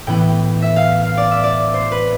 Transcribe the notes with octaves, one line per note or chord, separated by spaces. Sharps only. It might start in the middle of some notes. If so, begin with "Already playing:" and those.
A2 E3 B3 E4 G5
E5
F5
F5
D5
E5
D5
C5
B4